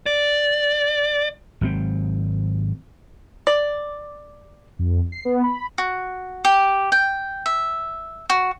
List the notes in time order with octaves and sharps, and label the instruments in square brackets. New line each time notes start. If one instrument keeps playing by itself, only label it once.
[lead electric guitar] D5
[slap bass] G#1 F#3 C4
[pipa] D5
[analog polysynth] F2
C7
B3
B5
[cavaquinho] F#4
G4
G5
E5
F#4